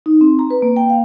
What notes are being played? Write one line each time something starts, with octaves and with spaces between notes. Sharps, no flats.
D#4
C4
A#5
B4
A#3
G5
F5